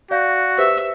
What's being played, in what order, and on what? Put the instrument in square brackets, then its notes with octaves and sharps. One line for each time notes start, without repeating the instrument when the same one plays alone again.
[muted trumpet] F#4 [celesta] D5 F5 G6
[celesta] G4 B4 C5 [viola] E5